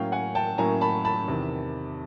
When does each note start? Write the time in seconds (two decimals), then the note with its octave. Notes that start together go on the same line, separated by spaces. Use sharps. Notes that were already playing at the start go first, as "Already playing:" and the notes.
Already playing: A2 F#3 A#3 C#4 F5 G5
0.12 F#5 G#5
0.35 G5 A5
0.58 A2 F#3 A#3 C#4 G#5 A#5
0.81 A5 B5
1.05 A5 B5
1.28 E2 C3 D#3